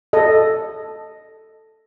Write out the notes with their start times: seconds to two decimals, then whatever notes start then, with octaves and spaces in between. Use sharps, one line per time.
0.13 A4 D#5